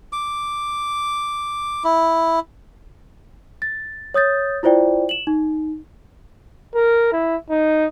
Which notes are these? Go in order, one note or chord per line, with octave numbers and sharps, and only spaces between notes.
D6
E4
A6
C#5 D#6 G6 A6
E4 F4 C5 D5 G5
E7 F#7
D#4
A#4
E4
D#4